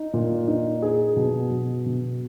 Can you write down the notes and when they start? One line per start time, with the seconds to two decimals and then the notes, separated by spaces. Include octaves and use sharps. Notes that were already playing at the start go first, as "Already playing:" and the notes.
Already playing: D#4
0.14 A#2
0.48 D#4
0.82 G#4
1.16 B2
1.51 B2
1.86 B2